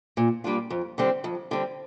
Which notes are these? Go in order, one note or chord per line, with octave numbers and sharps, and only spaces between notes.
A#2
G3 A#3 D4 F4
F2
D3 G3 C4
F2
D3 G3 C4